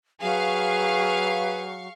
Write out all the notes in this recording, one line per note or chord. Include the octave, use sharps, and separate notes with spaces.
F#3 G#4 B4 F5 C#6